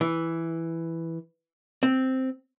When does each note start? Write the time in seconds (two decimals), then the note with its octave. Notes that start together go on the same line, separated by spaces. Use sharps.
0.01 E3
1.83 C4